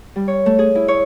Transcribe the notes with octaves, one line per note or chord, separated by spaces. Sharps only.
G3
C#5
A3
G#4
E4
C#5